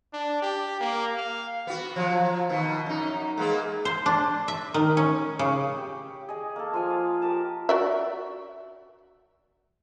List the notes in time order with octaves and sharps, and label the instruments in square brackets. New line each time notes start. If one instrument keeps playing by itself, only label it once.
[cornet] D4
G4
A#3
F5
[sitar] B3 F#4
F3 F#3
F3
B2 D#3
F#2 D#4
G#3 A#3 B3
[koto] C5
D4
E5
D#3
C#4
C#3
[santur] G4
G#4 D#5
A#3 A4
F3 F4 G#5 D#6
F5
G4 A#4 A5
[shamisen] F#4 D5 E5